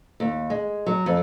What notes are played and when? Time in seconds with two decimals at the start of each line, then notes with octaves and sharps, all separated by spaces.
0.20 D#2
0.50 G#3
0.86 F#3
1.06 F2